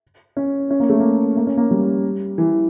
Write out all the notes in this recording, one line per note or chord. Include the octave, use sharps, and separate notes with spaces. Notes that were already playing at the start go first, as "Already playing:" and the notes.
C#4
C#4
A#3
A3
A#3
A#3
C#4
A#3
G3
E3